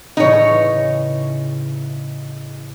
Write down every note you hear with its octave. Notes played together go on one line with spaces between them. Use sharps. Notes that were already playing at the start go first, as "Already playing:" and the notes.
A2 C#3 E3 D#4 C#5